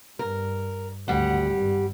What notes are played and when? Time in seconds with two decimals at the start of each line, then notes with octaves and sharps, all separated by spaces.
0.19 G2 A#4
1.08 G#1 D2 G3 F#5
1.57 G2